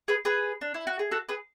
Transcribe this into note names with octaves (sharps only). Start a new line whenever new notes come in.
G#4 B4
G#4 B4
D4
E4
F#4
G#4
F#4 A4
G#4 B4